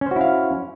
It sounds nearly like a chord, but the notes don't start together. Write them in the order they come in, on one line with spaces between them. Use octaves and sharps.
C#4 C5 F#4 E4 F5